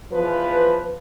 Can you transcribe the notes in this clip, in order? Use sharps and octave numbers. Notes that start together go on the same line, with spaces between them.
E2 F3 B4